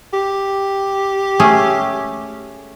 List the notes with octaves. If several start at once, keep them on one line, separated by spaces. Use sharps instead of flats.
G4
A3 C#4 G#4